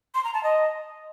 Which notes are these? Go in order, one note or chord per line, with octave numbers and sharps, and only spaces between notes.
C6
A#5
A5
D#5